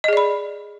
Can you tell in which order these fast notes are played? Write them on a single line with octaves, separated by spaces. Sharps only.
D#5 G#4 D5 B5